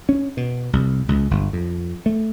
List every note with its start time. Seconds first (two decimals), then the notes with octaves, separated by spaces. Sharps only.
0.09 C#4
0.37 B2
0.73 C2
1.09 C#2
1.31 G1
1.53 F2
2.06 A3